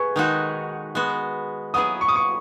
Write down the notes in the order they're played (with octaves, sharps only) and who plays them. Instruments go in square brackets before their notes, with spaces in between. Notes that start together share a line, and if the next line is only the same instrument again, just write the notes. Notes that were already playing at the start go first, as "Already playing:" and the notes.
Already playing: [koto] G#4 [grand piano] B4 G#5 C#6
[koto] D#3 G#3 D#4 F#4
G#3 B3 F#4
[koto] F#3 B3 E4 G#4 [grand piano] D#6
[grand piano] C#6
D#6
C#6